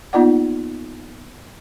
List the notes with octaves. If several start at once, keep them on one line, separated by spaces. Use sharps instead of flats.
A#3 B3 D#4 F4 D5 F#5